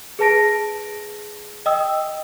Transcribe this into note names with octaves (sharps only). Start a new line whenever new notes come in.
G#4 B4 A5 A#6 D7
D#5 G5 D#6 E6